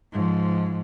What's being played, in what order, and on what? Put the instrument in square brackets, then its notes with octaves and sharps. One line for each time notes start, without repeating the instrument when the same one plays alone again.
[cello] G#2 F3